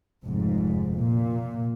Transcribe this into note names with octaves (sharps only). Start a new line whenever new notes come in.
F1 G#2
A#2